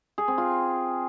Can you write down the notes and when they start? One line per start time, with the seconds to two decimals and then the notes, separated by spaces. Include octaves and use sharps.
0.18 G#4
0.28 C4
0.38 F4